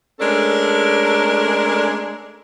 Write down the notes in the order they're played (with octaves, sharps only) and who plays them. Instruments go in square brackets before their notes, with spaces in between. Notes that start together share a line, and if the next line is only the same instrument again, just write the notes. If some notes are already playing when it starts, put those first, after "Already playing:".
[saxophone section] G#3 A3 C#4 D4 A4 A#4